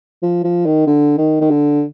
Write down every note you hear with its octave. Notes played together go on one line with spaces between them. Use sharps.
F3
F3
D#3
D3
D#3
D#3
D3